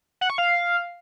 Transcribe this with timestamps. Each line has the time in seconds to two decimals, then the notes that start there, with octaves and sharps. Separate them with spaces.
0.21 F#5
0.30 C#6
0.38 F5